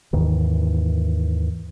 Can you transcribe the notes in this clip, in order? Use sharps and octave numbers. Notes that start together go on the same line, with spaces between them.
D#2 G#2 D#3 E3